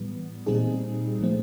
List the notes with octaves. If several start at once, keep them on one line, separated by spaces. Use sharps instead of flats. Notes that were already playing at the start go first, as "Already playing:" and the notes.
Already playing: A2 E3 G3 B3
A#2 G3 C4 D#4 G#4
A#2 F3 A3 C4